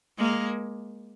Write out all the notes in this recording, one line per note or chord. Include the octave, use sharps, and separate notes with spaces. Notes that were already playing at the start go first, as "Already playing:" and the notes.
G#3 A#3